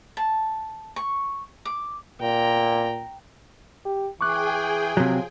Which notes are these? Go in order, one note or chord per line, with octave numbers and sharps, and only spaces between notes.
A5
C#6
D6
A#2 G5 A#5
G4
E3 G#4 G5 G#5 C#6 D6 F#6
C3 F3 F#3